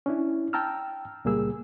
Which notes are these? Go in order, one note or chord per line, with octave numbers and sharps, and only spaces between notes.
C#4 D4 E4
G5 A5 A#5 E6 F6
C#2 A#2 G3 A#3 G#4 E6